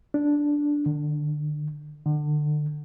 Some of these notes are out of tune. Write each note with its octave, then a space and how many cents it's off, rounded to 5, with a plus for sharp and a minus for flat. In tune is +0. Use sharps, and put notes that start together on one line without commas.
D4 -5
D3 +35
D3 +30